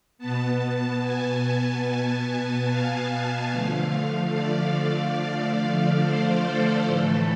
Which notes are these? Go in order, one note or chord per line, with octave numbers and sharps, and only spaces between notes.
B2 B3 A5
G#5
F5
D3 F3 A3
D5
C5
A4
A2 E3 A3